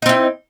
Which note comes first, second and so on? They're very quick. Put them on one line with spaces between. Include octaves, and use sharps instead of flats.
D#4 C4 E4